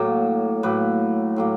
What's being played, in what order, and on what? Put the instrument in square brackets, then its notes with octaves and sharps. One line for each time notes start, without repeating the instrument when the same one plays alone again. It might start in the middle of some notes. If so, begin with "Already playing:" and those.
Already playing: [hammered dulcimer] A2 F#3 A#3
A2 F#3 A#3 B4
A2 F#3 A#3